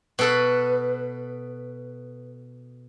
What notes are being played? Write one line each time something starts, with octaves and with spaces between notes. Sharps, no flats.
B2 A4 B4